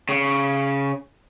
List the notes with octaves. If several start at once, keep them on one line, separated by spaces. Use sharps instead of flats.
C#3